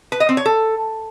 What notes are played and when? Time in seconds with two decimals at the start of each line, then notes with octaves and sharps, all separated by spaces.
0.12 B4
0.20 D#5
0.29 C4
0.37 C#5
0.45 A4